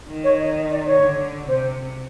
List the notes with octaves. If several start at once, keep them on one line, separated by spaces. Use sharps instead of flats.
D#3
C#5
D#5
D#5
D5
C#5
D3
C3 C5